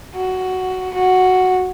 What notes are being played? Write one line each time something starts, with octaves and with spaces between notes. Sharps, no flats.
F#4
F#4